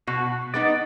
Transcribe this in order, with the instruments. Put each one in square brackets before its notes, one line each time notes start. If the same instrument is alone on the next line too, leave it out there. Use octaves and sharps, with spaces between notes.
[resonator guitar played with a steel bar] B2 [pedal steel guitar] F#4
[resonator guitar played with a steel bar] G#3 B3 D#4 [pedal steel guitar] D5